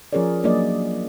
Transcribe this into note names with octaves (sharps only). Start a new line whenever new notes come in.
F3 C#4 G#4 A#4 C#5 D5
F#3 A#3 D4 G#4 D5 D#5